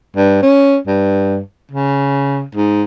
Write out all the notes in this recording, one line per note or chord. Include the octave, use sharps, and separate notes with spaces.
G2
C#4
G2
C#3
G#2